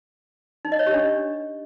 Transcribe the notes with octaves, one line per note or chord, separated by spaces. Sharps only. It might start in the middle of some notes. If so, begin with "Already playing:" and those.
D#4
D#5
C#5
G4
D4